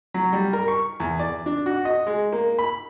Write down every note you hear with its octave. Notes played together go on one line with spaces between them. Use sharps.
F#3
G3
A#4
C#6
E2
D5
D4
F#4
D#5
G#3
A#3
B5